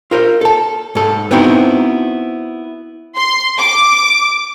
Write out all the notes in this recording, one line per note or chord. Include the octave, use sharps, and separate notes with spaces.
F4 A#4 C5
A4 A5
G#2 A4
B3 C4 D#4 E4 F#4 C5
C6
D6